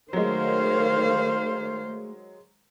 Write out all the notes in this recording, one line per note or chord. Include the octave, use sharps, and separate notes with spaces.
D#3 F#3 G#3 A3 C5 C#5 F5